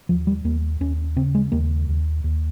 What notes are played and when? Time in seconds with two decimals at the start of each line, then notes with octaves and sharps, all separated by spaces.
0.09 D#2 F3
0.27 G3
0.44 D#2 A#3
0.80 D#2 C#4
1.17 C#3 C4
1.35 G#3
1.52 D#2 A#3
1.89 D#2
2.24 D#2